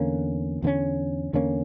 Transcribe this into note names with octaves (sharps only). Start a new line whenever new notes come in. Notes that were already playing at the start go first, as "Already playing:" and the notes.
Already playing: E2 D3 A#3 C#4
E2 D3 A#3 C#4
E2 D3 A#3 C#4